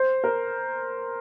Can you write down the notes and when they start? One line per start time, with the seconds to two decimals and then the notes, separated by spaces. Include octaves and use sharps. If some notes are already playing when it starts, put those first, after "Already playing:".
Already playing: C5
0.24 A#4